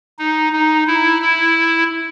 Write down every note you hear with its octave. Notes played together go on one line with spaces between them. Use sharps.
D#4
D#4
E4
E4